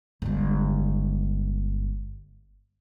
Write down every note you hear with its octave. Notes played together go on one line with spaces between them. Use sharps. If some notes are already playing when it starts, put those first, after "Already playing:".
G1 G#3